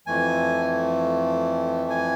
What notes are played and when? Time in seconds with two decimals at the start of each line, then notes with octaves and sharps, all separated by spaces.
0.06 F2 E3 A3 G#5
1.90 G#5